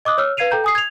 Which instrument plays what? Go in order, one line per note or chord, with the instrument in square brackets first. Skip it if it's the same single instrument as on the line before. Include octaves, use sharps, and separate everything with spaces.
[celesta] D#5 D6 D#6 F#6
C#5 E6 F6
B4 F5 G#6 C7 D#7 F7
A4 G5 A#5 G6
G#5 D#6 C7
G#6 F7